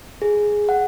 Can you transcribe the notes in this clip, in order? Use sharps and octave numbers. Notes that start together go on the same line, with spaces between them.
G#4
F#5